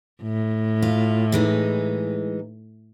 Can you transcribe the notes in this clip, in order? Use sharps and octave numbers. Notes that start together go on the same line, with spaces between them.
A2
F4
E3 G#3 D#4